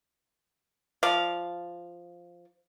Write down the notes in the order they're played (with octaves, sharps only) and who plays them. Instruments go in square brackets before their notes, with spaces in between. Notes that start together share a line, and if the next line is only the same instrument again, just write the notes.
[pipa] F3 D5 F5